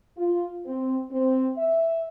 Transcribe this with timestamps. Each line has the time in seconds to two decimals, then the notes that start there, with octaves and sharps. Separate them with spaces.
0.17 F4
0.66 C4
1.11 C4
1.57 E5